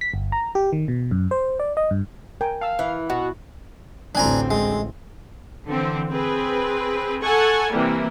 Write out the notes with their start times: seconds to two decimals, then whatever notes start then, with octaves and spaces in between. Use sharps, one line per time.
0.01 B6
0.14 G1
0.32 A#5
0.55 G4
0.73 D#3
0.88 B2
1.11 F#2
1.31 C5
1.59 D5
1.77 D#5
1.91 G2
2.41 A#4 G5 G#5
2.61 F5 A5 E6
2.79 E3
3.10 B2 F#4
4.15 A1 D2 C4 D4 G#5 A#5
4.51 G#3
5.67 D3 E3 C4
6.09 C4 G#4 B4
7.23 A4 F#5 G#5 C#6
7.71 C3 E3 G3 A#3